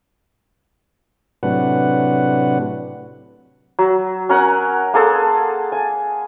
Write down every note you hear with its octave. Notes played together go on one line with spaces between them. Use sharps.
A2 C3 F#3 D4 B4 F#5
F#3
C#4 A#4 F#5 G#5
A#3 G#4 A4 C6
G#5